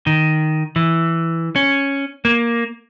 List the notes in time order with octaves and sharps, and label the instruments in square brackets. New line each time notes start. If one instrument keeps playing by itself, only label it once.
[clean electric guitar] D#3
E3
C#4
A#3